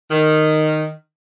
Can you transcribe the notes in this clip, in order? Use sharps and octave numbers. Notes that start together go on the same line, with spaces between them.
D#3